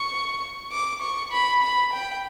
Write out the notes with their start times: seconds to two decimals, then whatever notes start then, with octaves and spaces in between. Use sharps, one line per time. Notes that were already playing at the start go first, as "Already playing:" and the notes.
Already playing: C#6
0.72 D6
1.02 C#6
1.33 B5
1.63 B5
1.93 G5